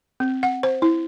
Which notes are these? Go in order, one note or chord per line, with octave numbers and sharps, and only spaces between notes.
C4
F#5
C5
E4